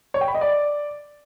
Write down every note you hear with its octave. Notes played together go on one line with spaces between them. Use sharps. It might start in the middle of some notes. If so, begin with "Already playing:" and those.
C#5
G5
B5
D#5
D5